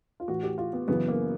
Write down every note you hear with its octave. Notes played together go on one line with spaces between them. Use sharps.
F4
A2 E3 F#4
G4
F4
B3
F#2 C#3 E3 B3
A#3